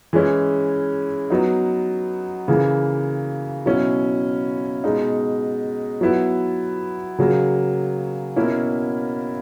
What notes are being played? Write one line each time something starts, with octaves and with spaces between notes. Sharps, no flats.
E3 G#3 C#4 E4
F#3 B3 D#4
C#3 E3 A#3
B2 F#3 C#4 E4
B2 G#3 D#4
F#3 B3 E4
C#3 F#3 A#3
B2 A#3 C#4 E4